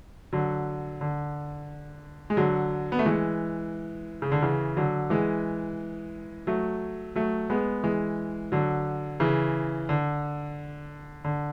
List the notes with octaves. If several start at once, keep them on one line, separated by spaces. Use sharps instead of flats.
D3 F#3
D3
G#3
D3 F#3
B3
A3
E3 G#3
C#3
D3
C#3 E3
D3 F#3
E3 G#3
F#3 A3
F#3 A3
G#3 B3
E3 G#3
D3 F#3
C#3 E3
D3
D3